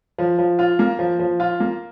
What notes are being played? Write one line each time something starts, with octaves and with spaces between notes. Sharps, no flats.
F3
F3
F4
A#3
F3
F3
F4
A#3